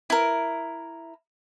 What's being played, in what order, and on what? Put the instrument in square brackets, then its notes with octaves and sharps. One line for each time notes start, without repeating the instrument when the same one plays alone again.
[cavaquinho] E4 A#4